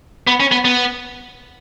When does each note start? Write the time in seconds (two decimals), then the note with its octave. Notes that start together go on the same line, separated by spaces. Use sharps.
0.27 B3
0.40 C#4
0.51 B3
0.65 B3